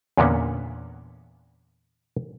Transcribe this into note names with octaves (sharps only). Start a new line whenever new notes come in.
E2 A#2 D3 A#3 B3 C#4